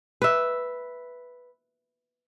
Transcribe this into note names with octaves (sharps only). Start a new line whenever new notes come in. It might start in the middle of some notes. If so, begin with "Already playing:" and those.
B4 E5